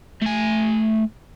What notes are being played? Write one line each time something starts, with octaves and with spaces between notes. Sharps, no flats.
A3 G#5